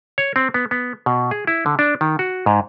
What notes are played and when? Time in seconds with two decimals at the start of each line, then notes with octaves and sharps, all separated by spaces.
0.18 C#5
0.36 C4
0.54 B3
0.71 B3
1.06 B2
1.31 G#4
1.47 E4
1.66 D3
1.79 D4
2.01 D#3
2.19 F#4
2.46 G#2